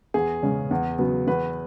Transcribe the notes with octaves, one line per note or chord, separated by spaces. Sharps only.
E2 G#4
C#3 G#3 C#4
E2
C#3 F#3 B3
E2 B4